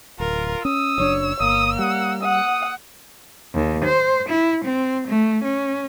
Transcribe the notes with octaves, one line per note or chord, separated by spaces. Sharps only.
D1 F4 A#4
C#4 D#6 E6
F#1 F#2 D4 C#5
G1 A#3 D#6
G3 F#5
F#5 D#6
D#2
C5
E4
C4
A3
C#4